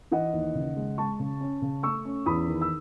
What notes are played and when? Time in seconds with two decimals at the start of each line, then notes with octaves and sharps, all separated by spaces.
0.11 E3 D#5 F#5
0.33 D#2
0.55 C#3
0.76 G#3
0.98 G#3 A5 C#6
1.19 C#3
1.41 C#4
1.62 C#3
1.83 A3 C#6 E6
2.05 C#4
2.26 E2 B5 D#6
2.47 D#3
2.61 E6